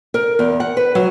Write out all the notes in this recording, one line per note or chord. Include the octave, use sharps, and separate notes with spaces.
A#4
E2
F#5
B4
F#3